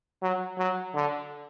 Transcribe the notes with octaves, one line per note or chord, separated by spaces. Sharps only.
F#3
F#3
D3